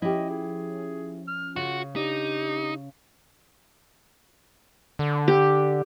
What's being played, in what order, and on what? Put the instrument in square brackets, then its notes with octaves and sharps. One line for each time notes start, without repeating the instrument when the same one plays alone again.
[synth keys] F3 C#4 [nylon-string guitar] E4 G4 [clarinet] D#5
[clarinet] G#4
F6
[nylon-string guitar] C#3 [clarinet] F4 [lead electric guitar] F#4
[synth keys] D4 [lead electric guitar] D#4 [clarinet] G4
[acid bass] D3
[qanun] G4